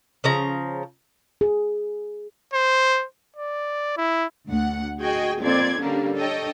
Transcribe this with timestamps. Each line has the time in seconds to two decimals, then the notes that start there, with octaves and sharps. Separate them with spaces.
0.24 C#3 F3 A#5
1.41 G#4
2.53 C5
3.36 D5
3.97 E4
4.49 D2 F#5
5.00 F#4 G#4 D#5 G5 G#5
5.41 F2 A#2 C4 D5 G#6
5.79 D3 G3 A#3 C#4 D4
6.15 D4 A4 C#5 D#5 G5